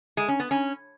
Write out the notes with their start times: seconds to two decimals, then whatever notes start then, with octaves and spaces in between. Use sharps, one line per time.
0.17 G#3
0.28 C#4
0.40 B3
0.51 C#4